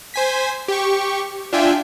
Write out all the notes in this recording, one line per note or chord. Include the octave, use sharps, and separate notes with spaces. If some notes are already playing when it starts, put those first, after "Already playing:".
C5 G#5 B6
G4 C#6
D4 F4 E5 G5 G#5